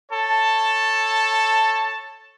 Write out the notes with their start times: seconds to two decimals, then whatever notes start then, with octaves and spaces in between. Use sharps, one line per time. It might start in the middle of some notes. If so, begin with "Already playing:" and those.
0.11 A4 C#5 A5